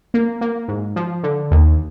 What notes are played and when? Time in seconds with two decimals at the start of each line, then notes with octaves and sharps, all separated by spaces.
0.14 A#3
0.41 A#3
0.68 G#2
0.96 F3
1.23 D3
1.51 D#2